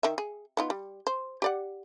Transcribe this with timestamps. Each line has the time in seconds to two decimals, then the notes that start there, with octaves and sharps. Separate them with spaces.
0.03 D#3 E5
0.18 G#4
0.57 B3 D#4 F4
0.70 G3
1.07 C5
1.42 G4 D5 F#5